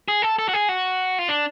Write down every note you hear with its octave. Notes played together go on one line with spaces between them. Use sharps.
G#4
A4
A4
F#4
G#4
F#4
F4
D4